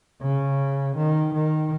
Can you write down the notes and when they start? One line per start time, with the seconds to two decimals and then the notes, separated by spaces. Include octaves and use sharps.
0.21 C#3
0.96 D#3
1.34 D#3